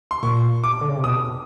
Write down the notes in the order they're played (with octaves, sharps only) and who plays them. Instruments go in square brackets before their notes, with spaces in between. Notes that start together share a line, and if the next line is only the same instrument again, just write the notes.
[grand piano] C6
[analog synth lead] A#2 [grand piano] C#6
[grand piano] D6
[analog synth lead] D3
C#3
C3
[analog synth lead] B2 [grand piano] D#6